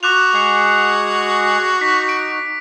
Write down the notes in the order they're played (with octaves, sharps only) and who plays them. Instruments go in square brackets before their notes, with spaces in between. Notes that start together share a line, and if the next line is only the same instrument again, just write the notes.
[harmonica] F#4 [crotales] D6 F#6 F7
[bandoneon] G#3 G#4 F#5
[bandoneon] D#4 [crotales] B6
[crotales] D7